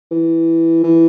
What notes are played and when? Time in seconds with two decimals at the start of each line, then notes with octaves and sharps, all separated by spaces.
0.11 E3
0.84 E3